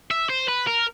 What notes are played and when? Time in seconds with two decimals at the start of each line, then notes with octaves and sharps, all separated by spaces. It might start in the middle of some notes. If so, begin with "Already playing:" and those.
0.11 E5
0.30 C5
0.48 B4
0.67 A#4